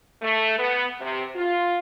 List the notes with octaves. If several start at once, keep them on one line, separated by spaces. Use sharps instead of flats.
A3
B3
C3
F4